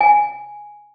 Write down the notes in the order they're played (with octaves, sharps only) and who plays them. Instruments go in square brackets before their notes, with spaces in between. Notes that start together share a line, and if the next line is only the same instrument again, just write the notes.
[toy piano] G#5